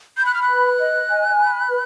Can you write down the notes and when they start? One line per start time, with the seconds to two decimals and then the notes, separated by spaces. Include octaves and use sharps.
0.17 B5 G6
0.26 F#6
0.34 F6
0.42 F#6
0.47 B4
0.79 D#5
1.09 G#5
1.38 B5
1.69 B4